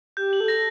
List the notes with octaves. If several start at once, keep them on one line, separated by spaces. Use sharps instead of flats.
G4 G6
F#7
A4
A#6